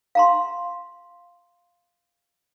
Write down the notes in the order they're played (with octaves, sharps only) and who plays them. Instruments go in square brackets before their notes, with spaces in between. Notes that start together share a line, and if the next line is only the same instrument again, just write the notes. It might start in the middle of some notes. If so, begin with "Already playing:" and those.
[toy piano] F5 A#5 C6